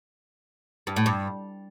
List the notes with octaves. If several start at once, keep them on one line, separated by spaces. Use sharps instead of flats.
G2
A2
G2